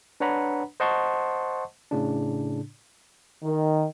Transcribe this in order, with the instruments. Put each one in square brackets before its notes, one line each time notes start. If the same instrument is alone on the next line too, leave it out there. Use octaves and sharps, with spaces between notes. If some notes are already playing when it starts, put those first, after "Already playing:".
[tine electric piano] D4 B4 C#5 F#5 A#5 B5
C5 D#5 F#5 A5 C6 C#6
A2 C#3 D4
[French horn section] D#3